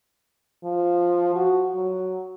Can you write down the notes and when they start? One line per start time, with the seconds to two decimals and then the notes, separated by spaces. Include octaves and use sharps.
0.64 F3
1.35 F#4
1.75 F#3